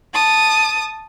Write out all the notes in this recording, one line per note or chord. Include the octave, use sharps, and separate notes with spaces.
A5 D#6